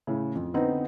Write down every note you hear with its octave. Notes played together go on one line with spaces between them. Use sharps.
A2 C#3
F2
D3 B3 C4 D#4 B4